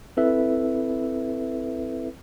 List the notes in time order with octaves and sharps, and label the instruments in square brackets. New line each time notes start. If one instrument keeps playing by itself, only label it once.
[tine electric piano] C4 E4 A4 B4 E5